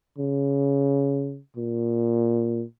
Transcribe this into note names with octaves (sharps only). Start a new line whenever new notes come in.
C#3
A#2